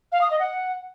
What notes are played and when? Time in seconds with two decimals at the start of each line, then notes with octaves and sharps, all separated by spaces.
0.12 F5
0.21 D#6
0.31 D#5
0.40 F#5